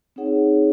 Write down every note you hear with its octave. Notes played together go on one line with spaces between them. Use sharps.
C4 D#4 G#4 C#5 F#5